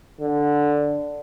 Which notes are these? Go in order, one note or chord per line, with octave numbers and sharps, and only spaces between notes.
D3